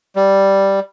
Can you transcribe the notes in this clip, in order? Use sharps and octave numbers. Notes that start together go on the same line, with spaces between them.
G3